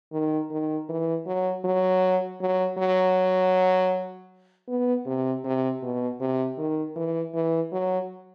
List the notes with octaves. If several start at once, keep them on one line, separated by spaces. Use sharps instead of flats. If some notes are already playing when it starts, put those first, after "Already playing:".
D#3
D#3
E3
F#3
F#3
F#3
F#3
B3
C3
C3
B2
C3
D#3
E3
E3
F#3